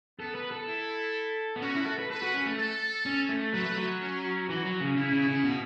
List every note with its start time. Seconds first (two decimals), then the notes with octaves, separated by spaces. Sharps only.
0.19 B3 A4
0.35 B4
0.51 A4
0.67 E4
1.56 B3
1.62 C#4 F#4
1.74 E4
1.86 A4
1.98 B4
2.10 A4 B4
2.22 F#4
2.34 C#4
2.46 A3
2.58 A4
3.06 C#4
3.29 A3
3.53 F#3 B4
3.64 A3
3.76 F#3
4.01 C#4
4.49 E3 F#4
4.65 F#3
4.80 C#3
4.96 C#3 E4
5.12 C#3
5.28 C#3
5.44 B2